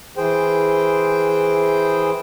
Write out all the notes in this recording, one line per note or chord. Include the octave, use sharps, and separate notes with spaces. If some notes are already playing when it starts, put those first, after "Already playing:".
E3 G#4 C5 G5